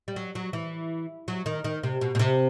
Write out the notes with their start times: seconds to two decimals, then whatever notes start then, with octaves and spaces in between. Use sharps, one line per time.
0.08 G3
0.16 F#3
0.35 F#3
0.53 E3
1.28 F#3
1.46 D#3
1.64 D#3
1.83 C3
2.01 B2
2.15 B2
2.19 C3